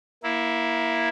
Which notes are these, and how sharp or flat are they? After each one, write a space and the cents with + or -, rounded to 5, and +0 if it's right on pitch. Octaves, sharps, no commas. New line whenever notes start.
A#3 +15 E4 +0